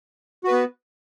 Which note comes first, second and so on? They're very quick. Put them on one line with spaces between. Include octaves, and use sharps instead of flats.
F#4 B4 B3